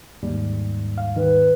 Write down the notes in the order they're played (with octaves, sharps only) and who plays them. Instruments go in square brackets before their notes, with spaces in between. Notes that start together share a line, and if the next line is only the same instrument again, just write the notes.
[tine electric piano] D#2 G#2 G3
[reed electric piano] F5
[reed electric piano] D#3 [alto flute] B4